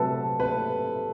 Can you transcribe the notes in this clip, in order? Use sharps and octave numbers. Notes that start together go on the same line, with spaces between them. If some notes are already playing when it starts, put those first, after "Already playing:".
Already playing: C3 F#3 A3 A4 B4
B4